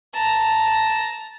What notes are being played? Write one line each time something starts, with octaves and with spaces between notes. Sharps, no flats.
A5 A#5